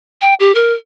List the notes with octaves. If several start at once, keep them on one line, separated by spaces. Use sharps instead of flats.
G5
G4
A#4